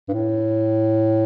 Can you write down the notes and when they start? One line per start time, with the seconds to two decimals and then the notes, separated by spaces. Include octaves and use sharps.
0.08 G2
0.13 A2